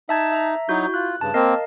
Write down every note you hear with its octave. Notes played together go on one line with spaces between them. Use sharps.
D#4 E5 A5 G#6
E5 A#5
F#3 D#4 E4 F#4 G6
F4 F#6
G2 C#3 A5
A#3 C4 A#4 D#5 F5